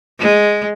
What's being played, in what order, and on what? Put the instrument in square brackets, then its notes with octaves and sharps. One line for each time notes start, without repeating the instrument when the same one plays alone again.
[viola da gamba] G#3